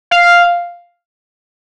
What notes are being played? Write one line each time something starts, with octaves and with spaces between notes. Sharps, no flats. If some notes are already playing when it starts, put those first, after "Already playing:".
F5